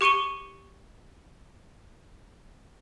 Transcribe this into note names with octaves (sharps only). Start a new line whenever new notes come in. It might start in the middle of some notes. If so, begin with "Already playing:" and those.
G4 C#6 C#7 D#7 G7